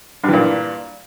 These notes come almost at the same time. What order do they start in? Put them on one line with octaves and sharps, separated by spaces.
G2 E3 A#2